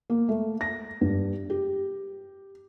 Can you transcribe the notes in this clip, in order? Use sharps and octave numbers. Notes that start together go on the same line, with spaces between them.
A#3
A3
A#6
G2
G4